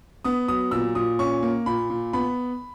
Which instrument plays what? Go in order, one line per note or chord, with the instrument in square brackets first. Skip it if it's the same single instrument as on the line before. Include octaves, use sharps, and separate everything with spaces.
[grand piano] B3 D#6
F#3 D#6
A#2 E6
A#2 D#6
C#4 C#6
A#3
A#2 B5
A#2
B3 B5